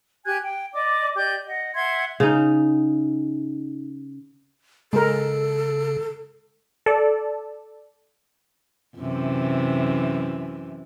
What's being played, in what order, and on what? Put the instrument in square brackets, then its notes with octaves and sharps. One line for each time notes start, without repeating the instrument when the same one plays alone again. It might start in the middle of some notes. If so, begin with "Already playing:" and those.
[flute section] G4 G#5 F#6 G#6
G5
D5 D#5 D6
G4 D5 D#5 G6
D#5 F#5
E5 F#5 C6 G#6
[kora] C#3 D#4
[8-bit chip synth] C#3 [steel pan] G#3 A#4 [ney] A4
[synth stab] A4 D5
[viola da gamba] F#2 C3 E3